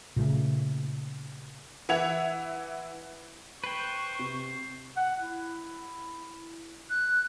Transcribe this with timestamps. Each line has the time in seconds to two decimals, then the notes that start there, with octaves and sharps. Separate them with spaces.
0.16 A#2 C#3 A3
1.89 E3 E5 F#5 G#6 F7
3.64 B4 C5 G5 C#6
4.19 C3
4.97 F#5
5.19 E4
6.90 F#6